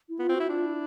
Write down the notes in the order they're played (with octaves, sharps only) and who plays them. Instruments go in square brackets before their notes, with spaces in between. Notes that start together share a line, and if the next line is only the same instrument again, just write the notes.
[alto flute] E4
[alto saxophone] B3 [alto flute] F4
[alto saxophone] C4
[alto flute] F#4
[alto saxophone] E4
[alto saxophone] D4 [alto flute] F4
[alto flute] E4